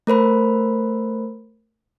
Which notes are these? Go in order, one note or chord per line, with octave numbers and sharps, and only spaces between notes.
A3 A#4 C5 B5